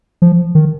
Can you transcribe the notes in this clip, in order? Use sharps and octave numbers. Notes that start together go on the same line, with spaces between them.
F3
D#3